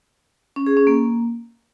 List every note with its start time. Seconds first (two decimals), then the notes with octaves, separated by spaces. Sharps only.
0.56 C#4
0.67 G#4
0.77 C#4
0.87 A#3